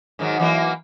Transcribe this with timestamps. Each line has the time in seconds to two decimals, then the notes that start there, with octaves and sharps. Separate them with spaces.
0.19 G#2 D#3 F#3
0.40 E3 F#3 A#3